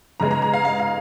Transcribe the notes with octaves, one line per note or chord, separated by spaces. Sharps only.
C#3 G#3 B3 A#5
A#5
A#5
F5
F5
F5